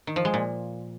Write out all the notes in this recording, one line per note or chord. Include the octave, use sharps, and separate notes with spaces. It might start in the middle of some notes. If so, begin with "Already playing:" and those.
D#3
F3
G#3
A#2